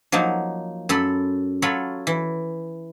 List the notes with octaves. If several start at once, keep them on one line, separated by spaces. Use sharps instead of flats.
F3 F#3 A#3 D#4
F#2 A4 B5 C6
F#3 F4 A4 C#5 B5
E3